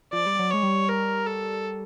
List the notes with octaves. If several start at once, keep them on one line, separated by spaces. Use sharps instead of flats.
F3 D5
G3
F#3
G#3 C#5
G3
A#4
A4